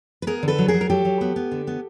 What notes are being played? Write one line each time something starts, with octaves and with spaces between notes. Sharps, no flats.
B4
B3 G#4 A#4
D3
A4 B4
F#3
G#4 A#4
F#3
A#4
F#3 G4 A4
F#3
B3
B3
D3
B3